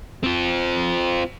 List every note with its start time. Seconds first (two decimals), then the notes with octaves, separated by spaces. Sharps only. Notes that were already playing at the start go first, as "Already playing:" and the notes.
0.24 C4 F4